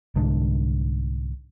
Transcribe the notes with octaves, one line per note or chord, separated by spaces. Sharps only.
C2 G#2 D3